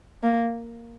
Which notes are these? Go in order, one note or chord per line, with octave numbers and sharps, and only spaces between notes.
A#3